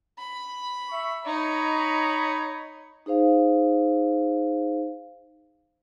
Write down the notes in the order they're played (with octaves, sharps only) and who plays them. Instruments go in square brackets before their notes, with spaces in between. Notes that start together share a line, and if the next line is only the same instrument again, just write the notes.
[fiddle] B5
[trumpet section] E5 C#6
[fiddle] D#4 [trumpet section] C#5 D#5 B5
[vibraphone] D#4 G#4 C5 F5